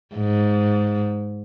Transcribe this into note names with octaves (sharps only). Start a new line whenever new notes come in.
G#2